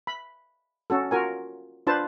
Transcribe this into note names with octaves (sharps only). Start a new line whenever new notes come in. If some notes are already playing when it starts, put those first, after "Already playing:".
B5
C#4 F#4 A4
F4 F#4 A#4 G#5
D4 F4 B4 C5 A5